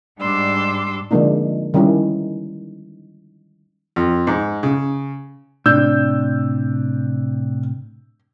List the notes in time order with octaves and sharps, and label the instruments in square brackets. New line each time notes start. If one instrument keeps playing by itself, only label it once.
[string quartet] G#2 G3 D4 C6 D6 E6
[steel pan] D3 F3 G#3 A#3 D4 D#4
D#3 G3 C#4 D#4 E4
[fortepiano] F2
G#2
C#3
[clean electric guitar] A2 C3 [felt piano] D4 [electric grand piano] E6 G6